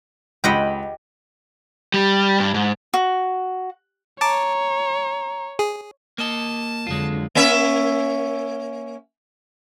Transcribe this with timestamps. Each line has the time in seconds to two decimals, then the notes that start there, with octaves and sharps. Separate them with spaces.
0.44 C#2 G4 D#5 F#5 B5
1.94 G3
2.40 G2
2.54 G#2
2.94 F#4
4.21 C#5 A5 A#5 D6
5.59 G#4
6.18 A#3 D#5 A5
6.87 F2 D3 F#3 G#3 F4
7.35 A#3 C#4 E5